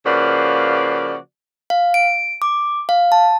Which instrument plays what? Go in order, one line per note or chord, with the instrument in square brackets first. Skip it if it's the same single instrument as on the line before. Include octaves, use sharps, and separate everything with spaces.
[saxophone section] C#3 F3 A#3 F#4 B4 D5
[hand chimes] F5
D7
D6
F5
A5